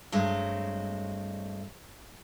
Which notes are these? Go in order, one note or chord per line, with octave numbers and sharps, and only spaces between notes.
G2 F#3 G#3 A3 C4